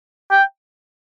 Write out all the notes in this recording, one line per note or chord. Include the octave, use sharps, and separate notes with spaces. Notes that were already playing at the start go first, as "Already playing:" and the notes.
G5